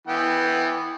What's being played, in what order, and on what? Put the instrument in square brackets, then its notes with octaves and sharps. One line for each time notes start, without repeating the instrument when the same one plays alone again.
[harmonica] E3 B3 G5